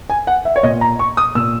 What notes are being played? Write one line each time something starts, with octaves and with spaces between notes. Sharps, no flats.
G#5
F#5
E5
C#5
A#2 D#5
A#5
C#6
D#6
A#2 E6